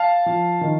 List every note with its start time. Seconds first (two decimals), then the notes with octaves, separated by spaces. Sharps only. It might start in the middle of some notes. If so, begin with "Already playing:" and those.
Already playing: F5 A5
0.26 F3
0.61 D#3